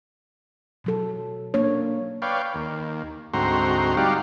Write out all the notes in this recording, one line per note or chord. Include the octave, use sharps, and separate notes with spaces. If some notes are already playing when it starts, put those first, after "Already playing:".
B2 F#3 A4
A#3 D4 C#5
B4 C#5 D5 F5 G5
D#2
D2 G#2 C4 F#4 A#5 C6
G3 D#4 G4 D5 F5 F#5